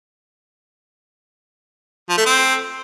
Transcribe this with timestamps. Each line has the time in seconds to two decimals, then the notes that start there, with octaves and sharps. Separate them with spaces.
2.09 F3
2.18 A3
2.26 C4